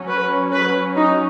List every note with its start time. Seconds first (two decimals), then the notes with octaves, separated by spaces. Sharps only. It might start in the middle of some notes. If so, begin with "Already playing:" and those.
Already playing: F#3 C#4
0.09 B4
0.53 B4
0.96 D#4